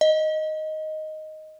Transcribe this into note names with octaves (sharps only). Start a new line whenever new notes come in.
D#5